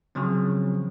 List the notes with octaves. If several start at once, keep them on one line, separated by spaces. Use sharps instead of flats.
C#3 F3 F#3 C4